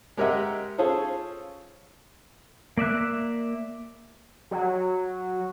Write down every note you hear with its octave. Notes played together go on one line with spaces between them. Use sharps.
G#3 G4 A#4 D#5 E5 F#5
C#4 F4 G#4 A4 C5 C#5
A#3 D5 E5 F#6
F#3